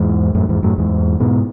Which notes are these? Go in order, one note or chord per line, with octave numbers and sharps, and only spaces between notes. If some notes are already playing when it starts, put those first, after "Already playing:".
Already playing: E2 G#2
F#2 A2
E2 G#2
F#2 A2
E2 G#2
G#2 B2